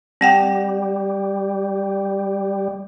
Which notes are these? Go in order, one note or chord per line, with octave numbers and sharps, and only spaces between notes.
G3 C4 F#5 G5